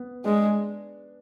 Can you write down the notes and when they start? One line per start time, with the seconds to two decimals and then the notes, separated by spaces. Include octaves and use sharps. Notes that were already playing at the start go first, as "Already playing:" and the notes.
Already playing: B3 B4
0.24 G#3 D4